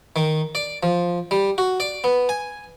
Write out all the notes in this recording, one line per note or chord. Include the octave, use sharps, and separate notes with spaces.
D#3
D5
F3
G3
F#4
D5
B3
G#5